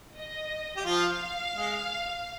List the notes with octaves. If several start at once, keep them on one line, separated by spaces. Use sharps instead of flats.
D#5
G4
F3 F4 F5
G#3